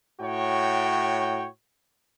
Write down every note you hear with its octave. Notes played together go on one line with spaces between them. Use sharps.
A2 F#4 C#5 G5